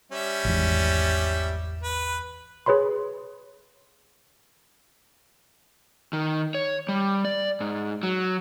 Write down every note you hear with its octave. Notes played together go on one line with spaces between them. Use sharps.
G3 C#4 E5
G#1 E2
B4
G#4 B4 C#5 B5 C6
D#3
C#5
G3
D5
G#2
F#3